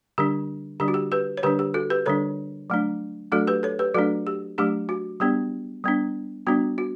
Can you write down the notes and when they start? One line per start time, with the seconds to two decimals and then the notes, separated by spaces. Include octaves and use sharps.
0.18 D3 G3 D4 G4
0.80 D3 G3 D4 G4
0.88 F#4
0.94 G4
1.12 G4 B4
1.37 C#5
1.43 D3 G3 D4 G4 B4
1.59 G4
1.74 F#4 A4
1.90 G4 B4
2.06 D3 G3 D4 A4 C#5
2.70 F#3 A3 D4
3.32 F#3 A3 D4 F#4 A4
3.47 G4 B4
3.63 A4 C#5
3.79 G4 B4
3.94 F#3 A3 D4 F#4 A4
4.27 G4
4.58 F#3 A3 D4 G4
4.89 F#4
5.20 G3 B3 D4 G4
5.84 G3 B3 D4
6.47 G3 B3 D4 F#4
6.78 F#4